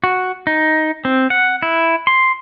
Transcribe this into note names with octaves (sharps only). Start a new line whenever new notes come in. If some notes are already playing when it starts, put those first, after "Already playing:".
F#4
D#4
C4
F#5
E4
C6